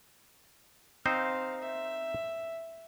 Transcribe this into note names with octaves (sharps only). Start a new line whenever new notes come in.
C4 D#4 C5 F5
E5